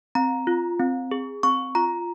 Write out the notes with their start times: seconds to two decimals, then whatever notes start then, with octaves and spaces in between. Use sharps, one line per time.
0.15 C4 A#5
0.47 F4
0.80 C4
1.11 G#4
1.43 C4 C#6
1.75 F4 A#5